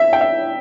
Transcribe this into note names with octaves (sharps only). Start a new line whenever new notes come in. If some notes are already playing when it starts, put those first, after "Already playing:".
Already playing: E5
G5
E5